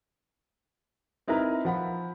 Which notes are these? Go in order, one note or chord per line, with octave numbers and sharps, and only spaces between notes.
C4 D#4 E4 A#4 B4 A#5
F3 F#5 B5